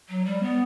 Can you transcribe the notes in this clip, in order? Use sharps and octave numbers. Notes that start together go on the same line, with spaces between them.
F#3
G3
B3